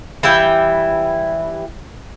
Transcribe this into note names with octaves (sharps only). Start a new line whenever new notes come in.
E3 G3 E4 G5